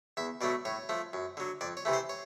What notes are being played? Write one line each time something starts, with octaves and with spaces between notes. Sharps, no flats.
E2 E5
B2 F#3 A3 D5
A2 C#5
F3 A3
F#2
D3 F#3
F2 D5
C#5
C3 E3 A3
C5
C#5